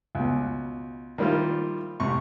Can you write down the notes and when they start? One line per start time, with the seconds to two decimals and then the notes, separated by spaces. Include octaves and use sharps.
0.15 C#2 B2
1.18 D#3 F3 G3 A#3 E4 F4
2.00 A1 C3 C#6